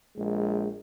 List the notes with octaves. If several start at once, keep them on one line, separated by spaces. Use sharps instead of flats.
A#1 G#3